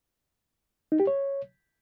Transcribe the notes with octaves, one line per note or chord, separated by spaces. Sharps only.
D#4
G4
C#5